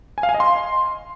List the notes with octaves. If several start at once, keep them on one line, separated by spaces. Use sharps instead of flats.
G#5
F5
G#5
D#5
C6